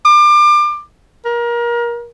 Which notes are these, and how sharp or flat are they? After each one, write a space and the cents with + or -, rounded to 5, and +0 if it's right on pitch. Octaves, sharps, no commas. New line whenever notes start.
D6 +30
A#4 +25